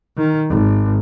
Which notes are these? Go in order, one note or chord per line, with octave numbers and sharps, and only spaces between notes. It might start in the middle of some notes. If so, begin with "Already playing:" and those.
D#3
G#1